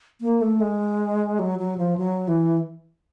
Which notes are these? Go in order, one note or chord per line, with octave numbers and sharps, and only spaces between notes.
A#3
A3
G#3
F#3
F#3
F3
F#3
E3